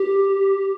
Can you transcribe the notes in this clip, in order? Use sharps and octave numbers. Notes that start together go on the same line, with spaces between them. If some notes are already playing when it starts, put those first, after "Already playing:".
Already playing: G4